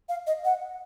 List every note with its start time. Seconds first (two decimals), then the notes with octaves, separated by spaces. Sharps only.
0.09 F5
0.27 D#5
0.45 F#5